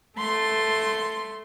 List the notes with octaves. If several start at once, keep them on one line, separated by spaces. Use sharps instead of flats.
A3 C6